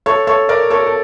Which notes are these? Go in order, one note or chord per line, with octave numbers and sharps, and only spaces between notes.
A4 C#5
A4 C#5
A#4 D5
A4 C#5
A4